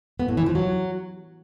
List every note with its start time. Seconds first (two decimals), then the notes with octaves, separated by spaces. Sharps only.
0.20 B3
0.28 A2
0.37 E3
0.46 F3
0.55 F#3